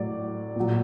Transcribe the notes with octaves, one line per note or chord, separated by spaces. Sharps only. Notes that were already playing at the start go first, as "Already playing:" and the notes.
Already playing: A2 F#3 D5
A#2 F#3